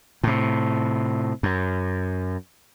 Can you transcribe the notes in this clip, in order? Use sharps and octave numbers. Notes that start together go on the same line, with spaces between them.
A2 C3
F#2